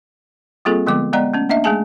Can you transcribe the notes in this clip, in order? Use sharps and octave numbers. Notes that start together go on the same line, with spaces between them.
G3 A#3 C4 F4 G#4 A4
D3 F3 G#3 B3 D6
G#3 B3 D5 D#5 F#5 A#5
A3 C#4
A#3 D4 D#5 E5
G#3 A3 G#4 G#5 A5